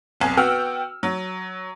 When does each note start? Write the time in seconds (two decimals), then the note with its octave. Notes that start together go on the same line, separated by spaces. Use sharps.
0.20 F1 B1 G#5
0.37 B3 F#4 G5 E6 F6
1.03 F#3